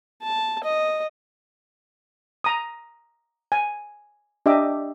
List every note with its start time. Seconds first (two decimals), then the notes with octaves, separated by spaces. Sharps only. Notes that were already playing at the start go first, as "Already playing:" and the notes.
0.23 A5
0.64 D#5
2.44 A#5 D#6
3.52 G#5
4.46 D4 G4 D#5 E5 D6